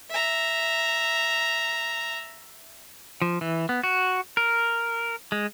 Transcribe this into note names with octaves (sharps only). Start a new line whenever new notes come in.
E5 A#5
F3
E3
B3
F#4
A#4
G#3